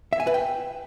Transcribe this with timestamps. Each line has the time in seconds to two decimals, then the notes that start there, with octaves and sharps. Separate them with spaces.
0.13 E5
0.20 G#5
0.27 B4
0.34 G5